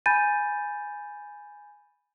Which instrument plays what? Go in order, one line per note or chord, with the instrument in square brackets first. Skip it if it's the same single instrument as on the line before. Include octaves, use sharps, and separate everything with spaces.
[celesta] G#5 B5 G6 A6 D#7